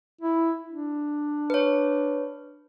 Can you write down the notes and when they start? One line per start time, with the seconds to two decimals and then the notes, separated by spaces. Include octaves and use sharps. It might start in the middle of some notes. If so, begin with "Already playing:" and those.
0.21 E4
0.69 D4
1.50 B4 C#5